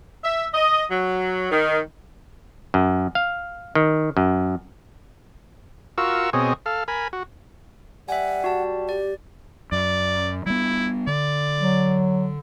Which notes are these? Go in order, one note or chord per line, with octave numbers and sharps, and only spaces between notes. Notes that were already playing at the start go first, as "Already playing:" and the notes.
E5
D#5
F#3
D#3
F#2
F5
D#3
F#2
F4 F#4 A#4 C#6 E6
B2 C4 G#4 C#5 D#5
A4 F5
A#4 G#5 B5
F#4
G3 E5 F#5 G#5
F#4 A5
G4 D5
F#2 D5
G3 B3 E4
D3 D5
F#3